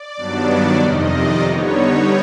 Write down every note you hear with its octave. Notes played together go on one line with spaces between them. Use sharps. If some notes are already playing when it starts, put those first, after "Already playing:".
Already playing: D5
G2 D#3 F#3 B3 D4
F2 C3 D#3 D#5
D5
D3 G3 B3 D#4 C#5